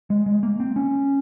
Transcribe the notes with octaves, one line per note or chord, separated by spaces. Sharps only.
G#3
G#3
A#3
C4
C#4